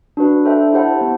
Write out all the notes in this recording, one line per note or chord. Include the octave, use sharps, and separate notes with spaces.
D4 F#4 B4
D4 A4 C5 E5 G5
E4 G4 C5 F#5 A5
B3